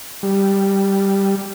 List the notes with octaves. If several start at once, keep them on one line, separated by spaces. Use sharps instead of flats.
G3